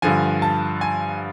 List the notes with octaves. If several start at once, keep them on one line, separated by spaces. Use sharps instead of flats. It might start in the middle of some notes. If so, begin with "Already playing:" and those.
G2 D3 F3 G#5
A5
G#5